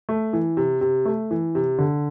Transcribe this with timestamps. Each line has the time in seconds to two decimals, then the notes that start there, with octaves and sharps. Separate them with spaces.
0.09 A3
0.33 E3
0.57 C3
0.81 C3
1.05 A3
1.31 E3
1.55 C3
1.78 D3